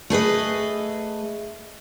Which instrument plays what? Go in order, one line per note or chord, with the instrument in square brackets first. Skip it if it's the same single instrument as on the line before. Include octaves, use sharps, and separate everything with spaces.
[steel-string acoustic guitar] A3 G#4 B4 D#5